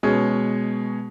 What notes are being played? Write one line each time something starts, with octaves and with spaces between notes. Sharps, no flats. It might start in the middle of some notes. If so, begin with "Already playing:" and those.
B2 G#3 C#4